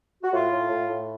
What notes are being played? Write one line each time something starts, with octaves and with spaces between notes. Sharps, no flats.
F#4
A2 F4
A2
A2
A2